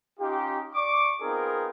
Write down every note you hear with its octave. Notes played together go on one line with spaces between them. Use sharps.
C#4 D#4 F4 G4
D5 C#6 D6
B3 C4 D#4 F4 G#4 A#4